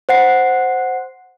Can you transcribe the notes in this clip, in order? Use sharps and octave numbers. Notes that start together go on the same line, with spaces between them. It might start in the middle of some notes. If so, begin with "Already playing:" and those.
C5 F#5 C7